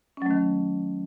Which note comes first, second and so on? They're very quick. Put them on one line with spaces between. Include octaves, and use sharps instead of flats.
C#4 F#3 A3 D#3